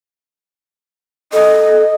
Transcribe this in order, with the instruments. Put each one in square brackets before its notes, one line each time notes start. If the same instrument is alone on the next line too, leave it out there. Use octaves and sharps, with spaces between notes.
[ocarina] A4 [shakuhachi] D#5